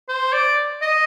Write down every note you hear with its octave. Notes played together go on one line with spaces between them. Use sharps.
C5
D5
D#5